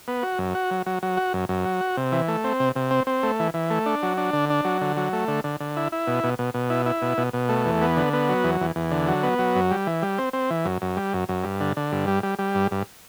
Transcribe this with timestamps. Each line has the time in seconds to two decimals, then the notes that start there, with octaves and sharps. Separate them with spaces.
0.08 B3
0.23 F#4
0.38 F#2
0.55 F#4
0.71 F#3
0.86 F#3
1.03 F#3
1.17 F#4
1.34 F#2
1.49 F#2
1.65 F#3
1.81 F#4
1.97 C3
2.12 E3
2.28 A3
2.44 C4
2.60 C3
2.76 C3
2.91 C4
3.07 C4
3.23 A3
3.39 E3
3.54 E3
3.70 A3
3.86 D4
4.03 F#3
4.17 D4
4.33 D3
4.50 D4
4.65 F#3
4.81 D3
4.97 F#3
5.13 A3
5.28 D3
5.44 D3
5.60 D3
5.76 E4
5.92 E4
6.07 B2
6.24 B2
6.39 B2
6.54 B2
6.70 E4
6.86 E4
7.02 B2
7.18 B2
7.33 B2
7.49 A3
7.65 E2
7.82 B3
7.96 D3
8.13 B3
8.29 F#3
8.44 E2
8.61 E2
8.76 E2
8.91 D3
9.08 F#3
9.23 B3
9.39 F#3
9.55 F#2
9.71 G3
9.87 E3
10.02 G3
10.19 C4
10.33 C4
10.50 E3
10.65 F#2
10.82 F#2
10.97 G3
11.13 F#2
11.29 F#2
11.44 G2
11.60 D3
11.77 D3
11.92 G2
12.08 G3
12.23 G3
12.39 G3
12.55 G2
12.71 G2